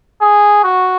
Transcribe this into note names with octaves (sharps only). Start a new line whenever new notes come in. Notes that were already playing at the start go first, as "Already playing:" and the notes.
G#4
F#4